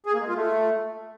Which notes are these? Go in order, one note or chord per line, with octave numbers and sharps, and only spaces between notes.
G#4
A#3
G#3
F4
A3